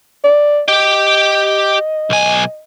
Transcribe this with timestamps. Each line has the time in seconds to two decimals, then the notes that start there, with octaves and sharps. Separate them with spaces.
0.24 D5
0.68 G4 D#5 G5
2.10 B1 G#5